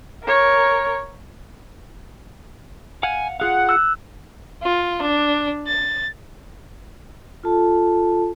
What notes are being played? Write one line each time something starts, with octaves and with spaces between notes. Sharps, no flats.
A#4 C#5
F5 F#5 G#5
F4 G#4 F5 F#5
E6 F#6
F4
D4
A6
F4 A4 A5